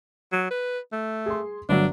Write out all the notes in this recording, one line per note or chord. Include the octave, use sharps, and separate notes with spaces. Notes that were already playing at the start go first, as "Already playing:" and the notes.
F#3
B4
A3
G#4 C6
G1 F#3 D4